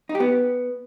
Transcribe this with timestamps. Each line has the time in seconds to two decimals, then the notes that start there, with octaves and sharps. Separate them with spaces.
0.09 D#4
0.15 G4
0.20 B3